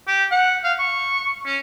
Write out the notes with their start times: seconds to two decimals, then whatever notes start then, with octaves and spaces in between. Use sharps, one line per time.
0.07 G4
0.31 F#5
0.64 F5
0.79 C#6
1.46 C#4